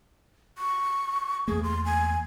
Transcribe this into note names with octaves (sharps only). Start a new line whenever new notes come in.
C#6
E2 A3 A#3 G#4
C6
G#5